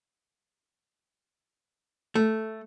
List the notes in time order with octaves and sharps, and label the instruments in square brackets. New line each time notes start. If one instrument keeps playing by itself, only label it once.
[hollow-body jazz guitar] A3